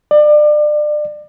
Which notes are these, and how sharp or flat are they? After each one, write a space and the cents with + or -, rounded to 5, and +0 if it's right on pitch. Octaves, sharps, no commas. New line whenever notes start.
D5 +30